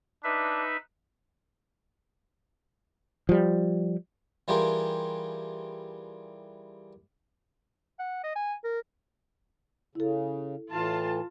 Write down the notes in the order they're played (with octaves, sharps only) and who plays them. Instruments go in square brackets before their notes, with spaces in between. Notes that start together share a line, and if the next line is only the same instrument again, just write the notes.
[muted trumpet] D4 [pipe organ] D#4 B4 E5
[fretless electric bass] F3 G3
[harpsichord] E3 G3 F4 G4 G#4 A#4
[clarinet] F#5
D#5
G#5
A#4
[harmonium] C#3 [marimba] E4 A4
[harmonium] A2 E3 [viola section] F4 A5